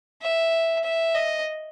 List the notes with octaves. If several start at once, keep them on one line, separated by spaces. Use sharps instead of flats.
E5
E5
D#5